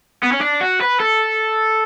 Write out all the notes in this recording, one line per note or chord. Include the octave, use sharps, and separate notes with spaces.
B3
C#4
D4
F#4
B4
A4